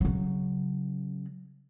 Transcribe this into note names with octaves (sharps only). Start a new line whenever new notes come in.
C#3 F#3